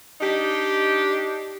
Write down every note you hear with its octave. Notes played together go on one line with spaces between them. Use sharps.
D4 D#4 G4